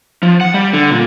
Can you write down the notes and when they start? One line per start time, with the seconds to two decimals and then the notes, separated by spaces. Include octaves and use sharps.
0.23 F3
0.41 F#5
0.54 G3
0.73 D3
0.91 A#2